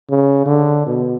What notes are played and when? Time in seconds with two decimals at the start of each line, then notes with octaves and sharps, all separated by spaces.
0.10 C#3
0.46 D3
0.87 B2